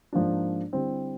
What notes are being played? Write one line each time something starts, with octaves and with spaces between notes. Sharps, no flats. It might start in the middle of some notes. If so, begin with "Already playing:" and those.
G#2 F3 A#3 D4
D3 G3 C4 E4